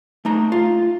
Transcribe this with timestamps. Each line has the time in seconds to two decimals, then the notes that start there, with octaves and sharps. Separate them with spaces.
0.25 A3 D#4 A#5
0.52 F4